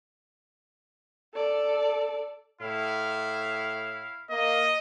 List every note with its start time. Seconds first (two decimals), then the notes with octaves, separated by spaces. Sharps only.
1.35 A4 D5
2.62 A2 E4 F5
4.30 A#3 D#5